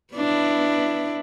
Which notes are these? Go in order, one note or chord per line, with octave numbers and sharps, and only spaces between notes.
B3 D4 E4